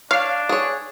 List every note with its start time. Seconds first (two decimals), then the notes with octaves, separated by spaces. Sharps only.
0.11 D4 C#5 F5 F6
0.49 G#4 C#5